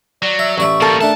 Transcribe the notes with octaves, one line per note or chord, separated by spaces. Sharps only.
F#3 D5
E5
A1 D5 E5 C#6
G3 A#3 A4 A#4
A3 D4 E5 A5